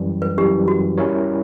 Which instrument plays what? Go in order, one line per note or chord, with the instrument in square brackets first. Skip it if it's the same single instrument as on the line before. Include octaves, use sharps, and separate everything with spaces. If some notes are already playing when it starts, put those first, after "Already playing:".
Already playing: [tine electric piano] F#2 E3 G3
[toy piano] B4
[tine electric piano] F#2 E3 G3 [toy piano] G4
[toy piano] F#4
[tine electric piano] G3 C#4 E4 A#4 C#5